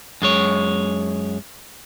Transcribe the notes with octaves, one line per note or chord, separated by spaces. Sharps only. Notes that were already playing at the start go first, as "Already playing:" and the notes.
F#2 G#3 C#5